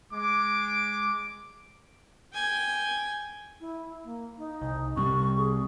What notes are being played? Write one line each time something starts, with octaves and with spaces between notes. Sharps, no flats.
G#3 D6
G5 G#5
E4
A#3
D#4
C2
C2 C3 G3 C#6
G#4